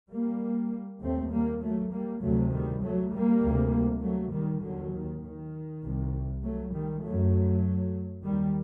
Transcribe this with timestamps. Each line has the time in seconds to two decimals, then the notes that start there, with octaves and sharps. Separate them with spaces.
0.11 G3 A#3
1.02 D#2 A3 C4
1.32 G3 A#3
1.62 F#3 A3
1.92 G3 A#3
2.22 D2 C3 F#3 A3
2.52 D#3 G3
2.82 F#3 A3
3.13 G3 A#3
3.43 D2 C3
4.03 F#3 A3
4.33 D#3 G3
4.63 D#2 D3 F#3
4.93 D#3
5.23 D#3
5.83 C2 C3
6.44 F#3 A3
6.74 D#3 G3
7.04 F#2 F#3 A3
8.24 D#2 D#3 G3